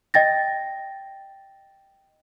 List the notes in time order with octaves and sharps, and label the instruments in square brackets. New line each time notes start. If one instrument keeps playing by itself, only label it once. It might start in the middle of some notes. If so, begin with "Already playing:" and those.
[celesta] D#5 G5 A6 A#6